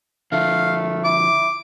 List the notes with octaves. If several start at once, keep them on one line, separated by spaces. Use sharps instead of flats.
D3 F3 A3 F5
E4 D6